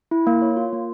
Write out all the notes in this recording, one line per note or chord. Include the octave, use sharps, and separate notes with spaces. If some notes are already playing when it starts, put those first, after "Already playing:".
E4
A#3
C#5
F4
A#3